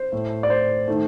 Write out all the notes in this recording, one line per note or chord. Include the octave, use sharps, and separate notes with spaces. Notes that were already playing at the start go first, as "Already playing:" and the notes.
Already playing: C5
A2 A3
D5
C5
D#3 A3